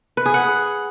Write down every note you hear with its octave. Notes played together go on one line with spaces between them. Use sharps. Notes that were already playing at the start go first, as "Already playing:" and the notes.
B4
G#4
F#5